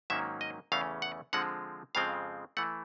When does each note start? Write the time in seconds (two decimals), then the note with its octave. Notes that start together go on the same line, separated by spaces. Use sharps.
0.10 G#2 D#3 F#3 A#3 C#4 E5
0.41 D#5
0.72 E2 C#3 E3 A3 C#4 F5
1.02 F#5
1.33 D3 F3 G#3 C4 F#5
1.95 F2 C#3 F3 G#3 C4 F5
2.57 E3 A3 F#5